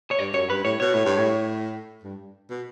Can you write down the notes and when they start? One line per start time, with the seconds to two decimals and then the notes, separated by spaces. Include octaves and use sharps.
0.11 C#5
0.19 G2 D5
0.34 F#2 C#5
0.50 G2 B4
0.64 A2 C#5
0.80 B2 C#5
0.94 A2
1.06 G2
1.18 A2
2.03 G2
2.50 B2